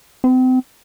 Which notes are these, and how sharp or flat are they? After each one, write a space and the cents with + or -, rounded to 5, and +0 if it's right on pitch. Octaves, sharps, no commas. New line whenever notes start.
C4 -35